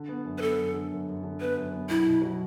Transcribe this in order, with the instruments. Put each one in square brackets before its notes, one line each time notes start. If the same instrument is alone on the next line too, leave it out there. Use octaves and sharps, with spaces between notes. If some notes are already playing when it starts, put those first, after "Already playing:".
Already playing: [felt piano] D3
B3
F#2
[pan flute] B4
[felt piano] B3 [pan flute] A4
[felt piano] F#2
D3
F#2
F#2
D3
[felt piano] B3 [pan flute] B4
[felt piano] F#2
B3
[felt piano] B1 [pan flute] E4
[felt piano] B2
F#3